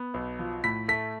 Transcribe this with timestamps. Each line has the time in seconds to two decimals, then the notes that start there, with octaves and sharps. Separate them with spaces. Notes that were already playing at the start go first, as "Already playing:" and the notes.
Already playing: B3
0.14 B1
0.39 F3
0.64 A2 B6
0.88 A3 B6